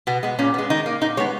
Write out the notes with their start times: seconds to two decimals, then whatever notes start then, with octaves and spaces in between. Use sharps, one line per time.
0.07 B2 B3
0.23 G#3 B3
0.39 A#2 C#4
0.54 G#3 B3
0.70 D#3 D#4
0.86 A#3
1.01 A#2 D#4
1.17 G#3 B3 C#5